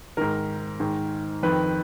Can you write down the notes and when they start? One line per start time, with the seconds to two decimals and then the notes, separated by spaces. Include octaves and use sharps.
0.17 G#2 D#3 A#4
0.80 G#2 D#3
1.43 F2 D#3 B4